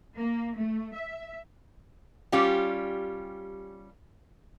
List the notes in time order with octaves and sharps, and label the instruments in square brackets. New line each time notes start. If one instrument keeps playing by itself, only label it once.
[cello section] A#3
A3
E5
[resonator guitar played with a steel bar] G3 C#4 F4 G4